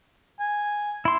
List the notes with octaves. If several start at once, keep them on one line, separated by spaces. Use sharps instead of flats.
G#5
E4 C6